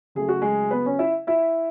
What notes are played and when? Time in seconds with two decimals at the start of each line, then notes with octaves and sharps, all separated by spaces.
0.15 C#3 F#3 A3 G#4
0.29 F#4
0.42 G#3 G#4
0.71 B3 B4
0.86 C#4 C#5
0.99 E4 E5
1.27 E4 E5